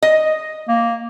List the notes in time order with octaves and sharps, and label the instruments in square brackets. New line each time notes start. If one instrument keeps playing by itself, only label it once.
[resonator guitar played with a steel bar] D#5
[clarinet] A#3